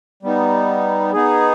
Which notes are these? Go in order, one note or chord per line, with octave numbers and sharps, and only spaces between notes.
G3 B3 D#4
B3 D#4 G#4